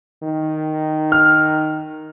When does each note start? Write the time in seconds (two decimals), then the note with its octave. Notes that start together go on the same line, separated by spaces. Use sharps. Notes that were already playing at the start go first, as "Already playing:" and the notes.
0.23 D#3
1.12 F6